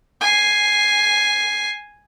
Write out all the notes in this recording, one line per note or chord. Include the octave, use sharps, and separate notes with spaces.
G#5 C7